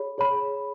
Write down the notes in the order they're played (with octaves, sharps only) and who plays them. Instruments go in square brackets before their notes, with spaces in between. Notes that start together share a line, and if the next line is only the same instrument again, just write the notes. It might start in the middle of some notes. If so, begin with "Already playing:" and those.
Already playing: [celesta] G#4 C#5 B5
G#4 C#5 B5